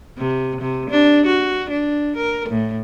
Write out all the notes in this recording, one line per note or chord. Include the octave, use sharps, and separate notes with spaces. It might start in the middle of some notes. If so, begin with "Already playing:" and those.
C3
C3
D4
F#4
D4
A#4
A2